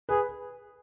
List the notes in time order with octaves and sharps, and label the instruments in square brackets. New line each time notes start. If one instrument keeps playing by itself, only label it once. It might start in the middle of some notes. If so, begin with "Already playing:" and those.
[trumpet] G#4 [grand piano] B4